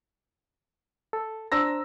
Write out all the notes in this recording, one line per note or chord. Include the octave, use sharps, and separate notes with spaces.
A4
D4 C5 A#5 E6 A#6